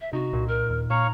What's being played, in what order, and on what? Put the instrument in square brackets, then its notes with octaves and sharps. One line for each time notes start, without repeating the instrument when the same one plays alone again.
[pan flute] E5
[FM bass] C3 [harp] D#4 [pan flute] F#4
[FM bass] C2 [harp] A#2
[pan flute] A#4
[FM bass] D#2
[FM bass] A#2 [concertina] C#5 F5 C#6 [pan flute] A#5